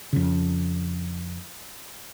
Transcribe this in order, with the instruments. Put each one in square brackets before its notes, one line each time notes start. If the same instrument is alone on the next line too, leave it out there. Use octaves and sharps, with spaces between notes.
[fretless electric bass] F2 C#3